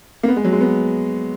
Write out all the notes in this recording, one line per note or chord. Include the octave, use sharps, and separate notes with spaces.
A#3
B3
G#3
F#3
G#3
B3